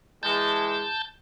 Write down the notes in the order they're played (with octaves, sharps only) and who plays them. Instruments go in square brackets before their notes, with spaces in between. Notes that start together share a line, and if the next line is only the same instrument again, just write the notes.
[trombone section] E3 G#3 [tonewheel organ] A5 G6